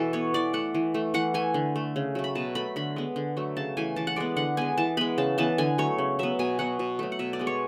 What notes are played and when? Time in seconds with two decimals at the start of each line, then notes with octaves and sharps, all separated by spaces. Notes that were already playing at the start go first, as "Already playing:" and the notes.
Already playing: B2 E3 A4
0.13 B3 C#5
0.34 E3 D5
0.53 A3 F#5
0.75 E3
0.94 A3
1.14 E3 F#5
1.34 A3 G#5
1.54 D3
1.76 A3
1.96 C#3
2.15 F#3 A3
2.24 B5
2.35 B2 A5
2.55 A3 B5
2.76 D3 B5
2.96 G#3 B3
3.16 D3
3.37 F#3 A3
3.57 C#3 A5
3.77 E3 A3 G#5
3.96 E3 A5
4.07 F#5
4.16 G#3 B3 D5
4.36 D3 F#5
4.57 G#3 B3 G#5
4.77 E3 A5
4.97 G#3 B3 B5
5.18 C#3 A5
5.38 E3 B3 A5
5.58 D3 G#5
5.78 F#3 A3 C#5
5.98 C#3
6.19 F#3 B3 E5
6.39 B2 G#5
6.59 F#3 B3 F#5
6.79 B2
6.99 F#3 A3
7.12 F#5
7.19 B2 E5
7.33 D5
7.39 G#3 B3
7.47 C#5